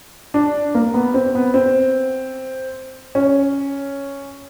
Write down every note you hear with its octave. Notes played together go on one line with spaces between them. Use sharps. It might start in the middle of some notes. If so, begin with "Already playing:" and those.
D4
A#3
B3
C4
B3
C4
C#4